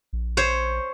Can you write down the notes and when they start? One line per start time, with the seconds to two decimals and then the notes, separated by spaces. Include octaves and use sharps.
0.13 A#1
0.37 C5 C#5